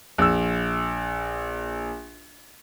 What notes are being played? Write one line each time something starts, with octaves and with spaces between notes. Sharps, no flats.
A#1 E6